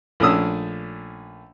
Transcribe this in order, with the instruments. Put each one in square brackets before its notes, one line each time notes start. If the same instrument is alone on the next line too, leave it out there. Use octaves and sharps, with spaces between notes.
[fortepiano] A#1 A3 C#4 D4 D#6 E6